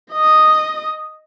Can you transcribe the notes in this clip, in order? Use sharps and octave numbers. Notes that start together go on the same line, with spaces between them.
D#5 D#6